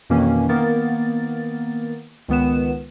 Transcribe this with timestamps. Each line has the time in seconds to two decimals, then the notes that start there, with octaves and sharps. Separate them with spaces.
0.10 F2 B2 D#3 E3 A#3 C#4
0.49 D#3 A#3 B3 A#4 A6
2.28 C#2 D#3 B3 B4 E7